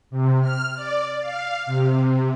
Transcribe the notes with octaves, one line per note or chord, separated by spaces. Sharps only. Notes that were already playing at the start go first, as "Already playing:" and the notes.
C3
F6
D5
F5
C3